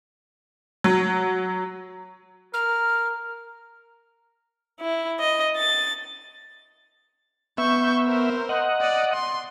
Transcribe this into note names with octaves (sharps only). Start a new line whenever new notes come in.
F#3
A#4 F6
E4
D#5
A6
B3 E5 C#6 G6
A#4 C5
D#5 F#5
D5
C6